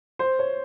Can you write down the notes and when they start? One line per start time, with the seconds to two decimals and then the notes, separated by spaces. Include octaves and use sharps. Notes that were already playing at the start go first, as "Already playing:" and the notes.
0.19 C5
0.39 C#5